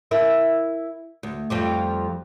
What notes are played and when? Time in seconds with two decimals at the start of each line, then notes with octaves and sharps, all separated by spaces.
0.11 E4 A#4 E5
1.23 D2
1.50 F2 F3 G3